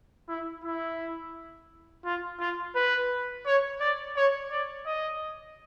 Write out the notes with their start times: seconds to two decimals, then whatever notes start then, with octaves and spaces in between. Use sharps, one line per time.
0.28 E4
0.64 E4
2.05 F4
2.40 F4
2.75 B4
3.46 C#5
3.80 D5
4.16 C#5
4.51 D5
4.86 D#5